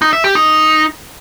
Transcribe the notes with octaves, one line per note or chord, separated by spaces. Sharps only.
D#4
E5
G4
D#4